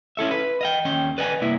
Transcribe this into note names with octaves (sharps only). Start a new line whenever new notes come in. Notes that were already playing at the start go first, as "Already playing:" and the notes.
C#4 E4 A4 E5
B4
D#5 F5 G5
D#2 C#4 G5
B4 D5 D#5 G5 G#5
C2 A#3 E4 E5